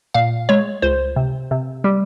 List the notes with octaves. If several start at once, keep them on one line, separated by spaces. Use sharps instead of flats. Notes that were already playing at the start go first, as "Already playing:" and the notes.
A#2 F5
G#3 C#5
C#2 C5
C3
C3
G3